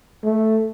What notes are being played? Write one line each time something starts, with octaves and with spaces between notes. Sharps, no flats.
A3